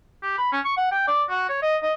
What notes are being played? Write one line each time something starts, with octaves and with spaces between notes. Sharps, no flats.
G4
B5
C#4
C#6
F#5
G5
D5
F#4
C#5
D#5
D#5